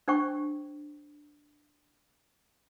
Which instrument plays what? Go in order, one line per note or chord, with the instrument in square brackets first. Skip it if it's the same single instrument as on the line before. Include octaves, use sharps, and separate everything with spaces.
[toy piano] D4 C5 G5 C#6